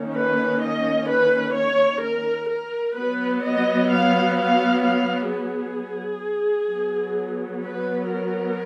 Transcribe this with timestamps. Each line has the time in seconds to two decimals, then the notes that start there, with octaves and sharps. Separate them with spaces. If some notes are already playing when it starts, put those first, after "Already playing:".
Already playing: D#3 A#3 C#4
0.16 B4
0.63 D#5
1.09 B4
1.56 C#5
2.03 A#4
2.50 A#4
2.96 F#3 B3 B4
3.43 D#5
3.90 F5
4.37 F5
4.84 F5
5.31 G#4
6.71 F#3 B3
7.64 B4
8.12 A#4